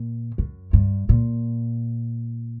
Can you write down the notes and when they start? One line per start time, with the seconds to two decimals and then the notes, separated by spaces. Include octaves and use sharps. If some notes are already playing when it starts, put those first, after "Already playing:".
Already playing: A#2
0.38 F#2
0.73 G2
1.09 A#2